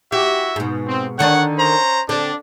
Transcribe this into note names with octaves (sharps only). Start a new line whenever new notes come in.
E4 F#4 G4 E5
G#2 B2
C4
D3 D#3 D4 C#5 F#5
C#4 C5 A#5
D3 C4 D4